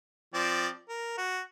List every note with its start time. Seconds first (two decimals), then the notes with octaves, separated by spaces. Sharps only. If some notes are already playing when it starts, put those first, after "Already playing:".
0.34 F3 C4 D5
0.89 A#4
1.17 F#4